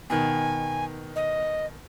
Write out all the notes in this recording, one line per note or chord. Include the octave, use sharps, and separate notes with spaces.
B2 D#3 G#5
D#5